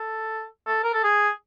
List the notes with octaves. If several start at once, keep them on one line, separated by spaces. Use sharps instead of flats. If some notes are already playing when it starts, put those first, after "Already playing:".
Already playing: A4
A4
A#4
A4
G#4